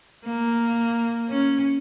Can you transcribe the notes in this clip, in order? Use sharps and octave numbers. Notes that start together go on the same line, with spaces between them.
A#3
C#4